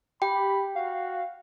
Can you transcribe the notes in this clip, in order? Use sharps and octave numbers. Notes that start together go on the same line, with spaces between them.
G4 G5 B5
F#4 F5